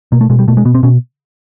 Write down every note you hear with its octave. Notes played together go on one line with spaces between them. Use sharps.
B2 A#3
A3
B2 G#3
G3
B2 A3
G#3
B2 B3
C4
B2 C#4